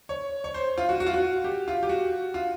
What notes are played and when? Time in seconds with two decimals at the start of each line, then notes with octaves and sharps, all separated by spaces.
0.09 C#5
0.44 C#5
0.54 C5
0.78 F4
0.89 F#4
1.00 F#4
1.06 F4
1.13 F#4
1.44 G4
1.68 F4
1.83 G4
1.89 F#4
2.34 F4